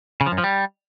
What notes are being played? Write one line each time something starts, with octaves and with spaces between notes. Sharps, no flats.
C#3
F3
F#2
F3
G3